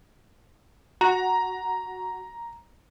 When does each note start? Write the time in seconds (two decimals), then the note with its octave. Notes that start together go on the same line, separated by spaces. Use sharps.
1.01 F#4 A#5